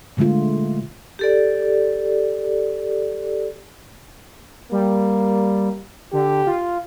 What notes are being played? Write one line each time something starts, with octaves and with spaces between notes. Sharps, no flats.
A#2 D3 G#3 A3 F4
G4 A4 D5
G3 A#3
D3 G4
F4